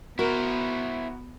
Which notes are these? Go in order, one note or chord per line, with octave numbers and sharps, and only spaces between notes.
B3 E4 F#4 A#4 C5